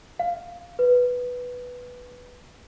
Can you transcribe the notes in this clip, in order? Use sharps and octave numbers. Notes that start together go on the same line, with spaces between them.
F5
B4